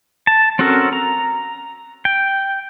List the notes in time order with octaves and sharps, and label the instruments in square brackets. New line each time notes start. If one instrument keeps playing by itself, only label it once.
[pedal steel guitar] A5
C4 C#4 F#4 A4 A#4
A#5
G5